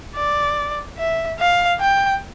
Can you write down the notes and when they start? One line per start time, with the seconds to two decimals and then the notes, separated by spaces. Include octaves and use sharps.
0.16 D5
0.98 E5
1.39 F5
1.80 G5